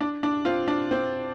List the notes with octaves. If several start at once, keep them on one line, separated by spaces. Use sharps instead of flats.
D4
D4
C4 F4
D4
C4